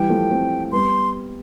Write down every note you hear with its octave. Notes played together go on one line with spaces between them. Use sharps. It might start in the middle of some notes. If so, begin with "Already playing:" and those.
Already playing: E3 G3 G5
F3 A3
A3 C4
G3 B3 C6